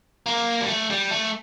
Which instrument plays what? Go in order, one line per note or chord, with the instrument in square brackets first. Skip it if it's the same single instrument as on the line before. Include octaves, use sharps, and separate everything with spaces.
[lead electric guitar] A#3
G3
A3
G3
A3